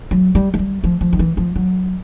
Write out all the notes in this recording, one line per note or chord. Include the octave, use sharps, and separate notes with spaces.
F#3
G3
G#3
G3
F3
F3
D#3
E3
F3
F#3